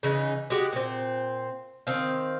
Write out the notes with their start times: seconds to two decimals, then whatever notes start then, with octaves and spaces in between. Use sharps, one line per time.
0.03 C#3 E3 D#4
0.50 G#3 F#4 G4
0.73 A#2 C4
1.87 D#3 C4 F5